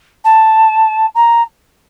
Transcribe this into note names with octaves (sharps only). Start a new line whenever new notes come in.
A5
A#5